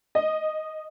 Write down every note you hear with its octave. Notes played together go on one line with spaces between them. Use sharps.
D#5